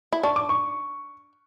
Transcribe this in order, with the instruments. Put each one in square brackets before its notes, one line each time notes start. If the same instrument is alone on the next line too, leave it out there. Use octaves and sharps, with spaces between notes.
[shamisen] E4
[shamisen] D4 [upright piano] C#6
[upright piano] D6
C#6